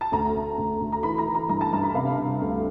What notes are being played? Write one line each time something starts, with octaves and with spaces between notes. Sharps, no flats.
A5
D2 A#5
D2
D2
D2
A#5
E3 B5
A#5
E3
A#5
G2 A#5
A5
G2 A#5
B5
C3 F5
C3
D2